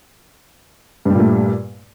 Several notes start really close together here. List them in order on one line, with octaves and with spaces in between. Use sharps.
G2 G3 A#2 A3